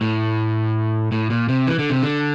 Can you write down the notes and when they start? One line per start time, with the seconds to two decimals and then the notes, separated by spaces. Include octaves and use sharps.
0.01 A2
1.12 A2
1.30 A#2
1.48 C3
1.67 E3
1.79 D3
1.90 C3
2.03 D3